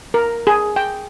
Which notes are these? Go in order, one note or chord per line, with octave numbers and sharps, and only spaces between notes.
A#4
G#4
G5